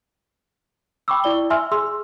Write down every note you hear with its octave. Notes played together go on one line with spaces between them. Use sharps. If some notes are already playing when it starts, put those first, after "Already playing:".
G5 B5 C#6 D6 E6
E4 D5 G7
E5 G#5 C6 E6 F6
G#4 C6 E6